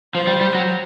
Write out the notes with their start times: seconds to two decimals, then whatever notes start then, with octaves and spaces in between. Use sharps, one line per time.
0.14 F3 C5
0.27 G3
0.41 G3
0.55 F#3